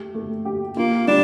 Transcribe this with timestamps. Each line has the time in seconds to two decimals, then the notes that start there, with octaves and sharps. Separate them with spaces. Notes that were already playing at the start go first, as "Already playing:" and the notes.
Already playing: A3 G4
0.14 A3
0.45 G4
0.77 A#3 F4
1.08 G3 D4